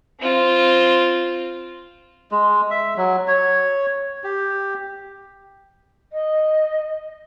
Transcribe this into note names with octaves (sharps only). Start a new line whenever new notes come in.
C4 F4
G#3
E5
F#3
C#5
G4
D#5